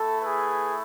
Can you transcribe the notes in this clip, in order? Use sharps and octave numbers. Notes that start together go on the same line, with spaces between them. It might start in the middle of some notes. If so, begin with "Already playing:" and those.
Already playing: A3 E4 A4
G#4 B4